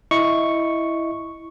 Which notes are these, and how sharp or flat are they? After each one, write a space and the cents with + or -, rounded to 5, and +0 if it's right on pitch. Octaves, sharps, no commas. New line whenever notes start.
E4 +0 D#5 +0 C#6 +0